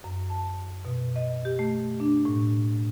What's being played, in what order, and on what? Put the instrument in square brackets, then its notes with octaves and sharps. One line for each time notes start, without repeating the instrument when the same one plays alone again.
[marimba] F#2
A5
B2
D#5
G4
A3
D4
A2